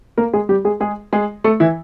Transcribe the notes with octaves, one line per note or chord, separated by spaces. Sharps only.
A#3 A#4
G#3 G#4
G3 G4
G#3 G#4
G#3 G#4
G#3 G#4
A3 A4
E3 E4